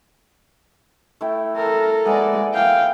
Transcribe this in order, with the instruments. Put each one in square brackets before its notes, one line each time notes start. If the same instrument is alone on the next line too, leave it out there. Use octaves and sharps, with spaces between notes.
[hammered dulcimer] A3 E4 G5
[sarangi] A4 [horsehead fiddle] A#4
[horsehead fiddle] G#3 D5 [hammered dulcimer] A#3 B3 [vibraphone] E5 F#5 G#5
[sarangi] F5 [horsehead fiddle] G5